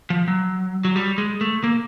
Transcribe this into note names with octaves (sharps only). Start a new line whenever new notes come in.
F3
F#3
F#3
G3
G#3
A3
A#3